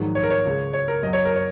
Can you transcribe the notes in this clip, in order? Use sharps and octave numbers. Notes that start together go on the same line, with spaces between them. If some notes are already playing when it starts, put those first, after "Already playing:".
Already playing: A#1 G#2 D#3 F#3
C#5
A#4
C#5
C#2 C#3 G#3
C#5
A#4
F#2 F#3 D#5
C#5
A#4
C#5